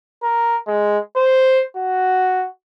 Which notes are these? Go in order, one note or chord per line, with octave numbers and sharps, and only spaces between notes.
A#4
G#3
C5
F#4